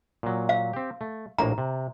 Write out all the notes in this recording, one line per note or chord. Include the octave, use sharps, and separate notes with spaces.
A#2 F#3
F5
C4 G4
A3
A#1 A2 A#3 A#5
C3